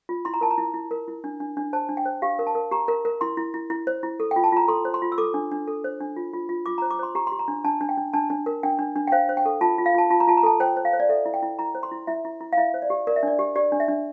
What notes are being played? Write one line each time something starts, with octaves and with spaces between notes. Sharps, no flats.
F4
E4 C6
A#5
A#4 A5
A#5
E4
E4
A#4
E4
D4
D4
D4
C5 A5
D4
G5
C5
G4 F5
A#4
A5
A#4
G4 A#5
A#4
A#4
E4 C6
E4
E4
E4
C5
E4
A4
G5
F4
A5
F4 A#5
A4 C6
C5
C6
F4
E6
A4 D6
D4
D4
A4
C5
D4
F4
F4
F4
F4 D6
A#5
C5
D6
C5 C6
G4 A#5
G4 C6
A#5
D4
D4 A5
D4
G5
D4
D4 A5
D4
A#4
D4 G5
D4
D4
G5
C5 F5
C5
G5
A4
F4 A5
F4
F5
F4 A5
F4 A5
A#5
F4 A5
A#5
A4 A5
C5 G5
C5
F5
C5
D5
A4 E5
E4
G5
E4
E4 A#5
C5
C6
E4
E4 E5
E4
E4
F5
E4 E5
C5
D5
G4
A#4 D5
E5
D4 D5
G4
G4 D5
D4
E5
D4